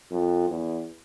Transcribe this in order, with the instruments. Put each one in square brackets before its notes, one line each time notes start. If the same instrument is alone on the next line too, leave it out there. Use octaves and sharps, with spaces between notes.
[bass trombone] F2
E2